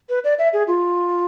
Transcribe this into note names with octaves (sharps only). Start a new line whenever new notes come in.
B4
D5
E5
G#4
F4